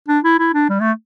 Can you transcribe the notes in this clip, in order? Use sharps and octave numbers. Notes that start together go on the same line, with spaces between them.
D4
E4
E4
D4
G3
A3